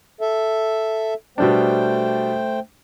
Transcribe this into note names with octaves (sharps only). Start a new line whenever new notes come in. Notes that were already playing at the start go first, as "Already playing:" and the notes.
A4 E5
B2 G3 A3 D4 C5 G5